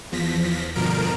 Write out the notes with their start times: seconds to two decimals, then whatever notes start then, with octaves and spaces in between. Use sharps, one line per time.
0.12 E2 F3 A#6 B6
0.75 G2 B2 D3 F3 A#4 D7